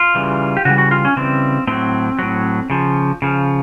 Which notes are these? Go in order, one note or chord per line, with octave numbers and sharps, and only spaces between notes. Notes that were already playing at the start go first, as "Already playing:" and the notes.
Already playing: F4
C#3 E3 G3
G4
C#3 E3 G3 F#4
F#4
F4
C#4
C#3 E3 G3 C4
A2 F#3 C4
A2 F#3
C#3 F3
C#3 F3